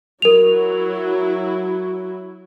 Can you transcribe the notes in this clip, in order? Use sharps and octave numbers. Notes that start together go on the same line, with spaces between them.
F#3 E4 A#4 F7